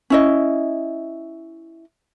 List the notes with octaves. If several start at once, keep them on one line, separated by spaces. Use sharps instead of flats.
C#4 E4 D#5